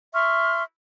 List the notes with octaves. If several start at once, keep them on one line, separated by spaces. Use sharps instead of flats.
E5 C6 C#6 F6